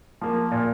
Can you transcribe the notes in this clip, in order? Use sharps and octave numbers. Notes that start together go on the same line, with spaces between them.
F3 A#3
A#2